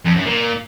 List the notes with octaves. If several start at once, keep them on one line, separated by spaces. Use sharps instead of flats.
F2
F#2
A#2